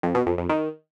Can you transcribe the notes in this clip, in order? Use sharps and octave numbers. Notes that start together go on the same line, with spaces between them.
F2
B2
F2
F2
D#3